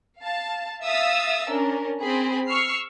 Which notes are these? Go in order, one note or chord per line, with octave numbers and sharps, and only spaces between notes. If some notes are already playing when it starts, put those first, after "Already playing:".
F5 A5
E5 F5 D#6 E6 A6
C#4 D4 A#4
C4 G#4 B5
C#6 E6 F6 C7